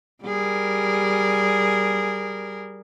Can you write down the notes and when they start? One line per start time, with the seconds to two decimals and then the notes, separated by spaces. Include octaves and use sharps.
0.24 G3 G#4 A#4